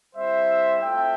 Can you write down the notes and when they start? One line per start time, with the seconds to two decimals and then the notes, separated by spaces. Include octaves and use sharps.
0.15 G3 C4 E4 C5 E5
0.81 A3 C4 F4 E5 G5